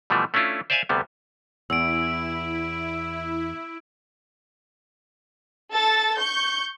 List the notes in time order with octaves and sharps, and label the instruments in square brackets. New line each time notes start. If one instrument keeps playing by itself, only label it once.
[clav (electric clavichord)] B2 E3 F3 G3 A3
A3 C#4 D4 E4 F4
C5 D5 E5 F5 G#5
D2 C3 G3 B3
[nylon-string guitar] E2 [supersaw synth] E4 [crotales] E6 D7
[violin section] A4 A6
C#6 G6